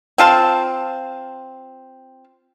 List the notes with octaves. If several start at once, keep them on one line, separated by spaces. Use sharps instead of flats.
C4 F4 A5